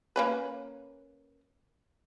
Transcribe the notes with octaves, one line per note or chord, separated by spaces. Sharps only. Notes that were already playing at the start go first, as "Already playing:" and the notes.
A#3 C#4 B4